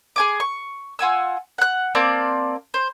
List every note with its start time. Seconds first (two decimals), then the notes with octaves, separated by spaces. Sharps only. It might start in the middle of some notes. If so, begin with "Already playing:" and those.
0.16 G#4 G#5 D6
0.40 C#6
0.99 F4 F#5 G#5 E6
1.58 F#5 F#6
1.95 A#3 C4 D5 A5
2.74 C5